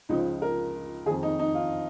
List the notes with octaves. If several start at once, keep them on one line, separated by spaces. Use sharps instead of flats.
C#2 C#3 F3 D#4
A#4
F2 D#3 G#4
D#4
D#4
F4